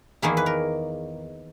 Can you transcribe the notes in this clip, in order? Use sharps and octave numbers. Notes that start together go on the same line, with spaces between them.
E2 D#3 A#3 E4 G#4
B4
A#4